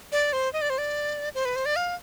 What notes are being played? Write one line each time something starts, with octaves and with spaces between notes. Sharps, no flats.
D5
C5
D#5
D5
C5
D5
C5
B4
C5
D5
F5